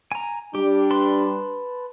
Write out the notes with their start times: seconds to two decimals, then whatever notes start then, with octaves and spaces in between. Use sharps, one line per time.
0.12 G#5 A#5
0.55 G3 D4 G4
0.90 B4 A5 C6